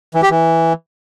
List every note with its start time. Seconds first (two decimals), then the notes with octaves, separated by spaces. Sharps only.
0.15 E3
0.23 G4
0.30 E3